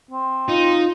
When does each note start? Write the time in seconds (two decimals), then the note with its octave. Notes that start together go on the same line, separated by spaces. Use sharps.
0.11 C4
0.49 D#4 F4